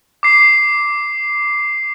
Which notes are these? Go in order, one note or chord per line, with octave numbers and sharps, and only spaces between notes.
D6 C7